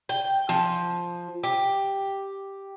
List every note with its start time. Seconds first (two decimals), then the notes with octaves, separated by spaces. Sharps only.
0.09 G5
0.49 F3
1.43 G4